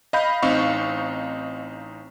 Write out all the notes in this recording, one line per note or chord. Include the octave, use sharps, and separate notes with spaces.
D#5 F5 B5 G6
A1 C4 D#4 F5 C#6